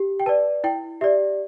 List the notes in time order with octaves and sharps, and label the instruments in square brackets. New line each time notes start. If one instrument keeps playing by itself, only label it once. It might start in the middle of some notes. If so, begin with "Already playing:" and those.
Already playing: [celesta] G4
G5
B4 D5 A5
E4 G5
G4 D5 E5